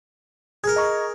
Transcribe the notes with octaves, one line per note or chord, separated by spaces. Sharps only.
G#4 A#4 G#6
D#5 A#5 C#6